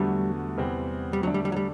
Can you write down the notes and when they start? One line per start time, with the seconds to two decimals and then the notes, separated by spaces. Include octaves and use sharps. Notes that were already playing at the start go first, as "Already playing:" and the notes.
Already playing: E2 D3 F#3 G3 A3
0.57 E2 C3 E3 G3 C4
1.13 G3
1.23 D3 F#3 A3 D4
1.34 G3
1.45 G3
1.52 F#3
1.57 G3